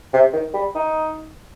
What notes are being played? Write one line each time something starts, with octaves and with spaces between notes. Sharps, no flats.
C3
D#3
G3
D#4